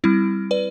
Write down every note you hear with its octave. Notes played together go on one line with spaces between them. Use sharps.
G3 C4 E4
B4 D5